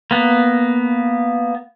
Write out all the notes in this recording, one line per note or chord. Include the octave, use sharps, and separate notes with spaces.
A#3 B3